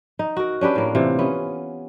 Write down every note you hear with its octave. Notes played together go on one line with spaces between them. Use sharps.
D#4
F#4 A#4
C#4 D4 G4 B4
A2 A#3
C3 E3 F4
B3 C#4